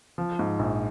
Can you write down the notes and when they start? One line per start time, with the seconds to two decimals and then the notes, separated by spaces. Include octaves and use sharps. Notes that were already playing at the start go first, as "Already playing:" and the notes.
0.18 F3
0.39 G#2
0.59 A#1